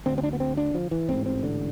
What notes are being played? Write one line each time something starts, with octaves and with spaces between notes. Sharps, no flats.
D2 D3 C4
C4
D4
B3
C4
D4
F3
E3
A1 G#2 C4
C4
D3